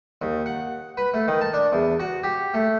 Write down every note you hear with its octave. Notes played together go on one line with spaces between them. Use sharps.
D#2
F#5
B4
A3
D#3
A5
D4
E2
F#4
G4
A3